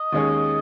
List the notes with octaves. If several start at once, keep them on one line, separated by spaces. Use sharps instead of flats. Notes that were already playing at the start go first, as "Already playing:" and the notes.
Already playing: D#5
D#2 D#3 G#3 C#4 G#4